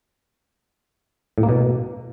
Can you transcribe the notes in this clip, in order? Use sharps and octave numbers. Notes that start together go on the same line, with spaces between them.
A2
A#3
B2